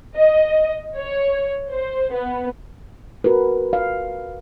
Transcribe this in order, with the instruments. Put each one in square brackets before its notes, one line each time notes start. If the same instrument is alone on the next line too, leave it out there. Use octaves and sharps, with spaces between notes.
[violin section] D#5
C#5
C5
B3
[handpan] F#4 A#4 B4
F5